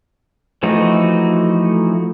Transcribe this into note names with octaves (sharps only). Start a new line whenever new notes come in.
E3 F3 A3 D#4 F#4